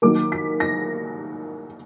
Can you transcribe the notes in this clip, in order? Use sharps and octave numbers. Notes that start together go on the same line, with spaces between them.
D#3 F#3 A#3 D6
B6
A#6